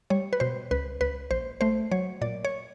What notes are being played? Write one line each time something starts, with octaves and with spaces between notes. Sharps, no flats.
G3 C#5
B4
B2 C5
C#2 B4
C#2 B4
A#1 C5
A3 C5
F#3 C#5
A#2 D5
C#5